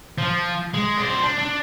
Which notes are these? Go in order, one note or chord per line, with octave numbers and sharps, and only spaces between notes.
F3
G#3
D4 C5
D4
D4